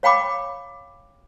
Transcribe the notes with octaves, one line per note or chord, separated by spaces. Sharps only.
C#5 F5 G5 B5 D6